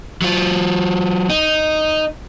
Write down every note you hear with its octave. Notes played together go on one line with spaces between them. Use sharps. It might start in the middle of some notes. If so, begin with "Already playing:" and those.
F#3 F4
D#4